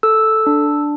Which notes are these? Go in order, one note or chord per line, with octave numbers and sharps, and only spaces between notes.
A4 E6
D4